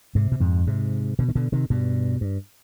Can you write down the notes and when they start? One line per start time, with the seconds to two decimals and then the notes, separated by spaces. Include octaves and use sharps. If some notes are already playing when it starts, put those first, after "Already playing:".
0.15 G#2 C3
0.32 B2
0.40 F2 G#2
0.67 G#2 C3
1.19 B2 D3
1.28 D#3
1.35 B2 D3
1.52 C3 D#3
1.70 G2 B2
2.21 G2